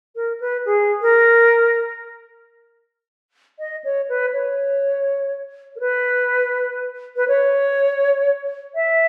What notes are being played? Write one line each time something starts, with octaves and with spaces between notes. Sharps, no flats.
A#4
B4
G#4
A#4
D#5
C#5
B4
C#5
A#4
B4
B4
C#5
E5